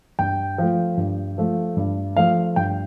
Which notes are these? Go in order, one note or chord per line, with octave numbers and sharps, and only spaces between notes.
G2 G5
F3 A3
G2
F3 A3
G2
F3 A3 F5
G2 G5